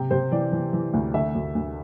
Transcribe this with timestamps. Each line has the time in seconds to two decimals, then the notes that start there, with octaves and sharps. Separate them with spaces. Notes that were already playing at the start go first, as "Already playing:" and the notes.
Already playing: C3 G5
0.11 C3 C5
0.31 E3 D5
0.52 E3
0.73 E3
0.93 D2
1.14 D3 E5
1.34 D2
1.55 D2